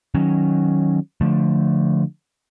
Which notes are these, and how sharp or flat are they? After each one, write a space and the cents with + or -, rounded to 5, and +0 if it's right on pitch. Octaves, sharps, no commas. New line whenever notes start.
D#3 +0 F#3 +0 C#4 -10
D3 +0 F3 +10 A3 -5